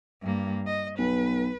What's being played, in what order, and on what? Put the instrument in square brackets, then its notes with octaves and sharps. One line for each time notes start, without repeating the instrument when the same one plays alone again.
[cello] G2 A#3
D#5
[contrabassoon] B1 [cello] B4